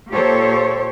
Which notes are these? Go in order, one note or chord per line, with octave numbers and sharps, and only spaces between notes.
A#2 G4 A4 C5 C#5